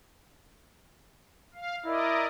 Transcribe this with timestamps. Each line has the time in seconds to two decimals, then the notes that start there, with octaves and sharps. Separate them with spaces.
1.54 F5
1.85 E4 A#4 D5 D#5